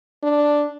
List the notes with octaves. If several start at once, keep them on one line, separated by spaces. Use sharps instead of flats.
D4